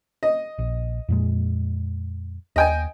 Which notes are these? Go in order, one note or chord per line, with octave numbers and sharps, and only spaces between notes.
D#5
A#1
F2 A#2 G#3
D#2 D#5 G5 G#5